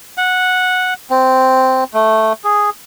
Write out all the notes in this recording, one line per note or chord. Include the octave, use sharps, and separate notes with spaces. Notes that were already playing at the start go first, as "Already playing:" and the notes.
F#5
C4
A3
G#4